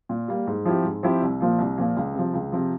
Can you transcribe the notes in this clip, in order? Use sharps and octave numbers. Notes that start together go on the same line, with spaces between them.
A#2
G3 A#3
G#2
F3 C4 E4 G4
G#2
F3 C4 E4 G4
C2
A#2 F3 A#3
C2
A#2 F3 A#3
C#2
C3 F3
C#2
C3 F3